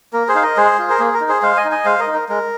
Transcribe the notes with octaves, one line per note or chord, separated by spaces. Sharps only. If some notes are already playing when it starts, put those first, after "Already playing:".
A#3 A#4
G#4 C5
D#4 F5
A#4 D#5
G#3 G#4 C5
F4
A#4
A#3 G#4
A#4
D#4
G#4 C5
G#3 C5 F5
D#5 G#5
D#4
D#5 G#5
G#3 C5 F5
A#4 D#5
D#4
A#4
G#3 A#4